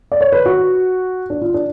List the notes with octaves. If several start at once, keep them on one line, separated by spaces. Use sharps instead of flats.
D5
C#5
B4
F#4
D4
F4
D4